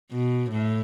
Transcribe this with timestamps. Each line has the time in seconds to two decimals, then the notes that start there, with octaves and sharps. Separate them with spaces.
0.11 B2
0.51 A2